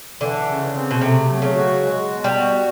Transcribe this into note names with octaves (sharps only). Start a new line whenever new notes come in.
D3 E3
C#3
C4
B2
C3 A3
F#3
C#3
F#4
G#3
B2
G3
F#4